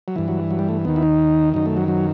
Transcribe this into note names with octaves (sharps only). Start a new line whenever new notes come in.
F#3
G2 E3
F#3
F#3
G3
A3
D#2 D#3 B3
E4
D#4
F#2 D#3 D#4
A3
F#3
F#3